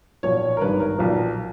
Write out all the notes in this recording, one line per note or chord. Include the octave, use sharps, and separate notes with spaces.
B1 A#2 F3 C#5
A#4
G#1 G2 D#3 B4
A#4
B1 A#2 F3